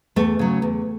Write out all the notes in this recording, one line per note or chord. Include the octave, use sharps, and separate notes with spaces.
E2 A3
C#3 F#3
E2